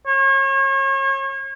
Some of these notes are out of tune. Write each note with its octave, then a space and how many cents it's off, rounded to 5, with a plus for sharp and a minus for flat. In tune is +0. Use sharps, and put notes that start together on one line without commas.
C#5 -35